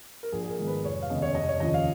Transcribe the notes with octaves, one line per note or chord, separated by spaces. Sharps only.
A#4
A#1 G#4
G#4
A#4
G#2 D#3 G#3 B3
B4
F1 C#5
F5
D#2 C#3 G#3 B3 D#5
C#5
F1 D#5
C#5
D#2 C#3 F3 D#5
F5